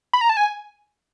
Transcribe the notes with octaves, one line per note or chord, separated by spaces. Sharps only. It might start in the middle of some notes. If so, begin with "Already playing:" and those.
B5
A#5
A5
G#5